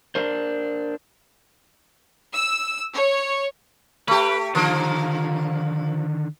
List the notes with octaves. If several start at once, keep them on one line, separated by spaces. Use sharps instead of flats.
D4 A#4 C5
E6
C#5
A3 G4 B4
D3 D#3 F3 A#3